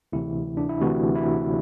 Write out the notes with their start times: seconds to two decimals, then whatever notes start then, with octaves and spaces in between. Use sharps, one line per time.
0.13 D2 C3 E3 E4
0.57 D4
0.69 E4
0.81 D2 C3 E3 F#4
1.15 E4